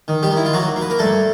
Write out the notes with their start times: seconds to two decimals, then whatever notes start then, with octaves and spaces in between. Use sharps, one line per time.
0.08 D#3
0.23 G3 G4
0.31 D#3
0.36 E4
0.45 F4
0.53 F#3 A#3 F#4
0.76 A#3
0.81 B4
0.90 A#4
0.99 G2 A3 A4